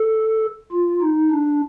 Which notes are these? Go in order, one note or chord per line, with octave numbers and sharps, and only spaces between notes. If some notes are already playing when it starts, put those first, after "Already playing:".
Already playing: A4
F4
D#4
D4